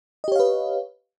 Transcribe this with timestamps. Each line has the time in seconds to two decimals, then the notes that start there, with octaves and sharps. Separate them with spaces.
0.24 D#5
0.28 G4
0.32 C#5
0.36 F5
0.39 B4